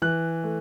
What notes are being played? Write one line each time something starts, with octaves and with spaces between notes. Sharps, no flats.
E3 F#6
A3